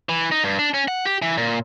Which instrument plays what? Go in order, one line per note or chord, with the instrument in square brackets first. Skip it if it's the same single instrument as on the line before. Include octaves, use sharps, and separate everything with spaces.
[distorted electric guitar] E3
D#4
G2
D4
C#4
F#5
G4
E3
A#2